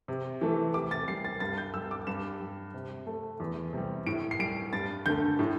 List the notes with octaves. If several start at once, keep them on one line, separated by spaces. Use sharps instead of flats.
C3
E3 A3
C3 D6
A6
G3 C7
A6
G2 A6
G6
G3 E6
D6
G2 E7
G3
C3
A3
E2
C3 G3
A2 D7
C7
G3 D7
G2 A6
D3 A3 G6
A2